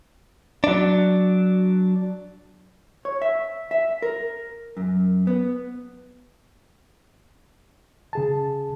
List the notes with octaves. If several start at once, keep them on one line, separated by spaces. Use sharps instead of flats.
F#3 D4
C#5
E5
E5
A#4
F#2
B3
C#3 G#4 A5